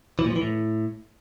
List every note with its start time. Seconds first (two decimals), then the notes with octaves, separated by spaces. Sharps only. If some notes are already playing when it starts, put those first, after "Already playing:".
0.19 E3
0.25 A#2
0.30 F3
0.36 E3
0.42 A2